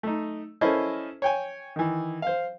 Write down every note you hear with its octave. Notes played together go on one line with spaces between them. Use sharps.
A3 D#4
C#4 E4 A4 A#4 C5 D#5
C#5 G5 G#5
D#3 E3
C5 F5